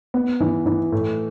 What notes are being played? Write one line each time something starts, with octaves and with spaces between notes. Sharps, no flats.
B3
E3
E3
A2